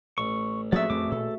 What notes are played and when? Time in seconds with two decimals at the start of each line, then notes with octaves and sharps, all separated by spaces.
0.18 A1 C#6
0.72 F3 A#3 C#4 F#4 G#4 D5 E5
0.90 F2 A3 C4 D6
1.12 A#2 A4